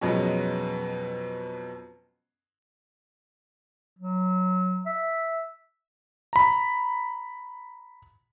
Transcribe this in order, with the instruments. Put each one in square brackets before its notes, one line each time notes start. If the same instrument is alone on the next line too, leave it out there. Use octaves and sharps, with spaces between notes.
[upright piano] F2 B2 F#3 G#3 B3 C#4
[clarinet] F#3
E5
[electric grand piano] A#5 B5